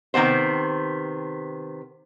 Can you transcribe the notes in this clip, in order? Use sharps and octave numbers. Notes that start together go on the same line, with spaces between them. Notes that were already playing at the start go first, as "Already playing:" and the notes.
C3 D#3 A3 B3 C5